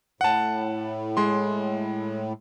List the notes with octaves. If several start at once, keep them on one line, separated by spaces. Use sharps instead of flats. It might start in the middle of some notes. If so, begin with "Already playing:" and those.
A2 F#5 A5
G#3 C6